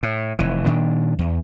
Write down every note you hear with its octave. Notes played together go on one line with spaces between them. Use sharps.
A2
F1 E3
A#2 D#3 D4
E2